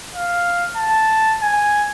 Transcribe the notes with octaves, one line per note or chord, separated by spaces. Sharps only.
F5
A5
G#5